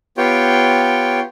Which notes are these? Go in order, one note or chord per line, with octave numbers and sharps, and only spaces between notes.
B3 F4 G4 C#5 G5